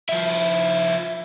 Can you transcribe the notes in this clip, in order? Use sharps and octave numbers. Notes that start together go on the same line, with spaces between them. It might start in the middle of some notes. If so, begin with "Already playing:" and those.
F3 E4